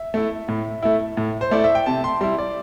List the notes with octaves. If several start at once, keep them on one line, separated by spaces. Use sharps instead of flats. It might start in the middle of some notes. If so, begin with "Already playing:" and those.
Already playing: E5
A3 E4
A2
A3 E4
A2
C5
A3 E4 D5
E5
G5
C3 A5
C6
G3 E4 C6
D5